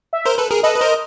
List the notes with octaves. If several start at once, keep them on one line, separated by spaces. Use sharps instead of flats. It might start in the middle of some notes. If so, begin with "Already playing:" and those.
E5
A#4 C5
A4 B4
G#4 A#4
A4 B4 D#5
B4
A#4 C5